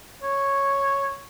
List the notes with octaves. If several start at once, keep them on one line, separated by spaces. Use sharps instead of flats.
C#5